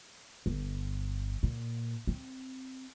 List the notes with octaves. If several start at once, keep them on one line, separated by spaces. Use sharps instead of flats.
G1
A#2
C4